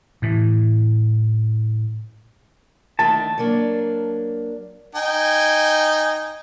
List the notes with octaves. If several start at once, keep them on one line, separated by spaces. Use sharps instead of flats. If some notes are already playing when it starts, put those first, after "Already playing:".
A2 E3
D3 D#3 A3 A5
F#3 A#3 D4
D#4 G5 G#5